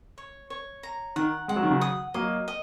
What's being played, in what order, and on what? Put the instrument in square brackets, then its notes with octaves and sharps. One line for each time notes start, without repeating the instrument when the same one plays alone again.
[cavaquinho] C#5
C#5
A#5
[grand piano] D#3 [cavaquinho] F#5
[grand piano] G#3 [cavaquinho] F#5
[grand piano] F#3
D#3
C#3 F#3
[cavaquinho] D#6
[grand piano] F#3 A#3 [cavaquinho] D#5
[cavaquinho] D#5